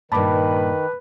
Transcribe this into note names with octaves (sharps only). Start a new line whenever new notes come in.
G2 A#2 D#3 B4 A5 B5 D6